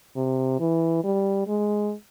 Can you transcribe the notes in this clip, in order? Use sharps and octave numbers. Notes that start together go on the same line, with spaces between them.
C3
E3
G3
G#3